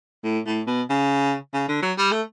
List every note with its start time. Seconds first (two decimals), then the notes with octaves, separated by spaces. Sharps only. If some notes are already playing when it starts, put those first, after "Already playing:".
0.24 A2
0.46 A2
0.67 B2
0.90 C#3
1.54 C#3
1.68 D3
1.82 F#3
1.98 G3
2.11 A3